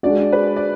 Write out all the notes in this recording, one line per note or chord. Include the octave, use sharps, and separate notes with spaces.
G#3 D4 F#4 D5
B4
D5